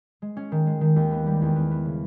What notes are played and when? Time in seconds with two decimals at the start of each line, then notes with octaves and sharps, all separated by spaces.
0.22 G#3
0.37 C#4
0.52 D#3
0.67 G#3
0.81 D#3
0.96 D#2
1.11 B3
1.26 G3
1.42 E2
1.56 B3
1.71 B3
1.86 C#3